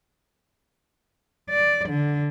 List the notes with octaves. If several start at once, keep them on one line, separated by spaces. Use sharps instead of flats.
D5
D3